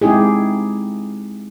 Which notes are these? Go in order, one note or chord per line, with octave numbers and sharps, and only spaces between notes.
G#3 C4 D#4 E4 G4 G#4